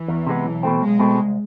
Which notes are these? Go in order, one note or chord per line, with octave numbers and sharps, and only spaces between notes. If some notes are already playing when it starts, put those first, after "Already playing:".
Already playing: E3
E2
C3 G#3 B3
B1
B2 A3 C4
B1 G#3
B2 A3 C4
C2